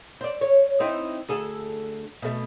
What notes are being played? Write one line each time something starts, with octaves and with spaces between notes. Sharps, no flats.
C5 D5
C#5
C4 D#4 E4
D2 G#4 A4
B2 A3